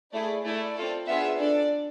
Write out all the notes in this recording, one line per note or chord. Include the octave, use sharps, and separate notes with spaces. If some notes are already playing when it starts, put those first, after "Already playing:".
A3 E4 G#4 D5
A3 E4 A4 D5
C4 F4 A4
B3 D4 F4 G#4 E5
D4 A4 D5